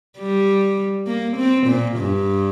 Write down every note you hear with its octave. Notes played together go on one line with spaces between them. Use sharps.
G3
A#3
C4
A#2
G2